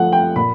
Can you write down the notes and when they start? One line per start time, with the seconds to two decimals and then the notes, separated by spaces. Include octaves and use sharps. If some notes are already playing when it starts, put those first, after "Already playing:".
Already playing: F3 A3 F#5
0.12 G5
0.36 A#2 B5